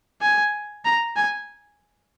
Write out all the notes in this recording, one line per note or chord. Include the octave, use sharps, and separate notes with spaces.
G#5
A#5
G#5